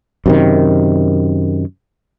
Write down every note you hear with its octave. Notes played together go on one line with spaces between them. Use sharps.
F#2 C3 D#3